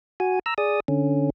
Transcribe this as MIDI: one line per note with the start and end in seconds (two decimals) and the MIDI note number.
0.20 0.39 66
0.20 0.39 80
0.46 0.54 82
0.46 0.54 88
0.58 0.80 68
0.58 0.80 74
0.58 0.80 87
0.88 1.30 50
0.88 1.30 61